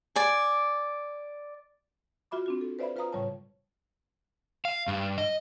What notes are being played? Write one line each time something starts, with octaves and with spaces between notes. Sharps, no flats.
D5 G#5
F4 F#4 E5 B5 D6
C4 D4 F#4
A4
B4 C5 D5 E5 F5 B5
F4 B4 C5 F5 A#5 D#6
A2 C#3 G3 C#5 A5
F5
G2
D#5